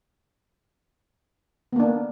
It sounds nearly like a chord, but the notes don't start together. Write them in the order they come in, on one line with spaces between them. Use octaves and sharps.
B3 A#3 D4